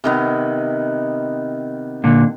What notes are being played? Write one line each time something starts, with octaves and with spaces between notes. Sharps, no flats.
C3 D#3 B3
A#2 D3